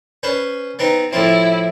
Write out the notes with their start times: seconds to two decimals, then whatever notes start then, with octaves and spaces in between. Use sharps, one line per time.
0.23 C#4 B4 C5
0.79 B3 C4 D#4
1.13 A2 F3 C4 E4